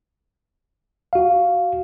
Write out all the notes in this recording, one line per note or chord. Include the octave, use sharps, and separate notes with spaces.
F#4 F5